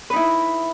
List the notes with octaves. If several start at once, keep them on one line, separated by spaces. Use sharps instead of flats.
D#4 E4 B4